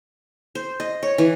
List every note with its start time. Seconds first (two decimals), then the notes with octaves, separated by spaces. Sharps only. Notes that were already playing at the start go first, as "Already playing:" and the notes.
0.55 C5
0.80 D#5
1.03 C#5
1.18 E3